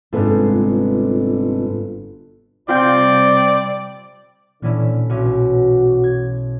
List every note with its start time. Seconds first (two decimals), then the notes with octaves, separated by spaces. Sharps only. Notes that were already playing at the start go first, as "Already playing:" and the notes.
0.13 G1 G#2 C3 F4 A4 B4
2.69 C3 G3 C4 F4 D5 G5
4.62 A#2 D3 E3 G3 C#4 E4
5.09 B1 C#4 F#4
6.04 G#6